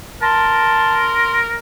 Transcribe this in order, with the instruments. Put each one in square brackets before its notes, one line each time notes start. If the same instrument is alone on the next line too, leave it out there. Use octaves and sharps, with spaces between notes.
[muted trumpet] A#4 [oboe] A5 [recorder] C6